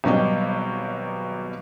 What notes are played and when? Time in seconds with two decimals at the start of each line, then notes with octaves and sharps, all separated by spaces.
0.04 G#1 B2 F#3 G3 D#5